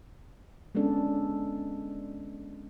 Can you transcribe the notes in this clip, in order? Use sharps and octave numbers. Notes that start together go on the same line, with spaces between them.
G#3 B3 C#4 D4 A4